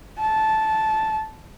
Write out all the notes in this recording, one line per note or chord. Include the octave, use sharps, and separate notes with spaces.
A5